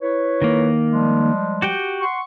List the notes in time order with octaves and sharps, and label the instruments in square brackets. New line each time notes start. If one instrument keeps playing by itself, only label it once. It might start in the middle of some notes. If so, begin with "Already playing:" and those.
[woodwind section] E4 B4 C#5
[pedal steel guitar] D#3 A#3
[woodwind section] F3 G3 G#3
[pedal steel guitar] F#4 G4 G5
[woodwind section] F#5 C6 C#6